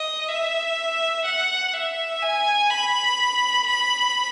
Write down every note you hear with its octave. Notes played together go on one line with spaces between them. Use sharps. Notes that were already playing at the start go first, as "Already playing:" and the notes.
Already playing: D#5
E5
F#5
E5
G#5
B5
B5